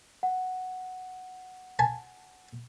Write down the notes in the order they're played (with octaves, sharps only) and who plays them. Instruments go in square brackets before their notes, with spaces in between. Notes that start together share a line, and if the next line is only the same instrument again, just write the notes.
[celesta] F#5
[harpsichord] G#5 A5